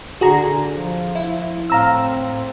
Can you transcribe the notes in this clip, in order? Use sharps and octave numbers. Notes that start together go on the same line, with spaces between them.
D3 F#4 G#4 A#5
F3
E4
A2 C4 F5 A#5 E6